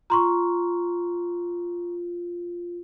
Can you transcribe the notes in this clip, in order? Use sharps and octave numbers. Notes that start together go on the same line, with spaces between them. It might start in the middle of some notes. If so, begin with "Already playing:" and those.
F4 A#5 C6 C#6